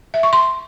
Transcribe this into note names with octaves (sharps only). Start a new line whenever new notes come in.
E5
C#6
C6